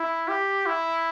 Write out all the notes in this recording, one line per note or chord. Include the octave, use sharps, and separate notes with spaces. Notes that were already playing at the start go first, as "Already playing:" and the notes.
Already playing: E4
G4
E4